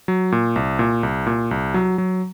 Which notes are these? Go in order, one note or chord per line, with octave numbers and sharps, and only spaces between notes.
F#3
A#2
C2
A#2
C2
A#2
C2
F#3
F#3